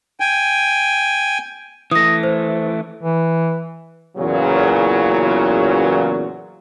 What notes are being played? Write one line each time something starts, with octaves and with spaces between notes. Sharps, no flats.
G5 G#5
E3 A3 D#6 A#6
C5
E3
E2 A#2 C#3 F#3